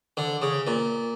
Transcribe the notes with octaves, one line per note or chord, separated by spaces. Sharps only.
D3
C#3
A#2